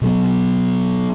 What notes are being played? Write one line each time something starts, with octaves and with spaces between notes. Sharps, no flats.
B2 F#3 B3